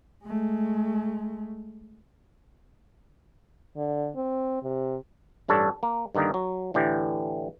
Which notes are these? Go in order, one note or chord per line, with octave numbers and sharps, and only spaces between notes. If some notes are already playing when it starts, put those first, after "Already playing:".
G#3 A3
D3
C4
C3
A1 G2 D4 A4 C#5
A#3
G2 D3 D#3 A#3 D#4
F#3
A2 D3 E3 G4